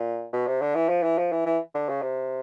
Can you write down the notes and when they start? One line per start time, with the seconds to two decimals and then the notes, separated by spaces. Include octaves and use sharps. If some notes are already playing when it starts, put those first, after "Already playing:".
Already playing: A#2
0.33 B2
0.47 C3
0.61 D3
0.75 E3
0.89 F3
1.03 E3
1.18 F3
1.32 E3
1.46 E3
1.75 D3
1.89 C#3
2.02 C3